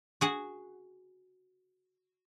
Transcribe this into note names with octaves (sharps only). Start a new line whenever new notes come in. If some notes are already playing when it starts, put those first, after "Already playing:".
F#4 G#4 F#5